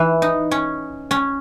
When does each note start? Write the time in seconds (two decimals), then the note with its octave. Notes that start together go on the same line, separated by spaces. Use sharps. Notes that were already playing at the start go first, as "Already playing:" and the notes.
Already playing: E3
0.22 D#4
0.51 C#4
1.11 C#4